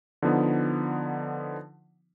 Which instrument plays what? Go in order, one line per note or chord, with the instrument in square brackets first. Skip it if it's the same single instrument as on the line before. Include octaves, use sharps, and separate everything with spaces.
[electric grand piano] D3 F3 B3 D#4